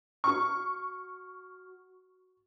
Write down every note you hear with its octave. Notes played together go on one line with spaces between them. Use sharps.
F#4 C#6 F6